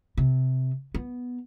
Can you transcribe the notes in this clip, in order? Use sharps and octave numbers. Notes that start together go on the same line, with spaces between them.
C3
B3